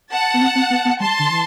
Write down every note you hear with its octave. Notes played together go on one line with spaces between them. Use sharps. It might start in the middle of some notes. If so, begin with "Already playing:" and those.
F#5 A5
B3
C4
C4
B3
B3
G3 A5 C6
D3
E3